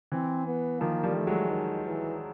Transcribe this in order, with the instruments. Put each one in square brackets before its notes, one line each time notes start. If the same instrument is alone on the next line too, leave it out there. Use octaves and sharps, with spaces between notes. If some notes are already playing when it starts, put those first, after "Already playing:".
[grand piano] E3 [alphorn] C4
[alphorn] B3
[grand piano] D#3 F3 [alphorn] A#3
[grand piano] F3 G3
[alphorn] A3
[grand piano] F#3 G#3
[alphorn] D#3
E3